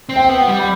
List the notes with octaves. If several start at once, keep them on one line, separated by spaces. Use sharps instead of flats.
C4
G5
B3
F#5
G3
B5